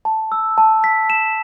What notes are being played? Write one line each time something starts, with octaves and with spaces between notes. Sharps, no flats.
A5
E6
A5
B6
E7